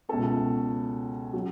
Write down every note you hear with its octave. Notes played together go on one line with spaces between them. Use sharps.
C#2 B2 A3 C#4 A4
C#3 F#3